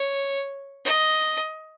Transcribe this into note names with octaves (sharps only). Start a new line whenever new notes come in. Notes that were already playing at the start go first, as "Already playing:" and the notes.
Already playing: C#5
D#5